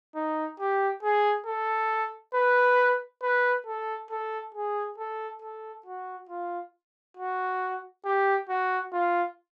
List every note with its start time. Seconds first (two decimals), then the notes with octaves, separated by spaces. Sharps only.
0.15 D#4
0.60 G4
1.03 G#4
1.46 A4
2.34 B4
3.22 B4
3.66 A4
4.11 A4
4.54 G#4
4.98 A4
5.42 A4
5.86 F#4
6.29 F4
7.17 F#4
8.05 G4
8.49 F#4
8.93 F4